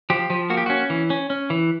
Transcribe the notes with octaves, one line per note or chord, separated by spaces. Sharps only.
F3 G4
F3
A#3 F#4
G4
C#4 F#4
E3
C#4
C#4
E3